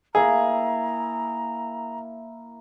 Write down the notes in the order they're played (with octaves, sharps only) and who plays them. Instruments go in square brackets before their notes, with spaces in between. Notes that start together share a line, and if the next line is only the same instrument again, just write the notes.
[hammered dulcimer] A#3 E4 [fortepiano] G#4 [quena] A#5